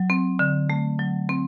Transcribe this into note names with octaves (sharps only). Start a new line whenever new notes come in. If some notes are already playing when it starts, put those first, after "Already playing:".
Already playing: F#3
C4
D3
A3
F#3
C4